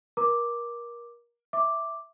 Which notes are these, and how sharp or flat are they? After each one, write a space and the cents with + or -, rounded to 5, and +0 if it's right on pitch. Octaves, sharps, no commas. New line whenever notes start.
A#4 +25 A#5 +5 D6 +0
E5 +0 D6 +0